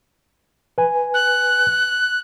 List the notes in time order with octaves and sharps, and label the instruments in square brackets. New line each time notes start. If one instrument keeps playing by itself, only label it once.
[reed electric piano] B4 G#5
[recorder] F#6